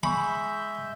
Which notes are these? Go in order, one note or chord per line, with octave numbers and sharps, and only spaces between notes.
G#3 E5 G#5 B5 C#6 G6